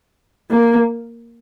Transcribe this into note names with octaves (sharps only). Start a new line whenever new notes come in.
A#3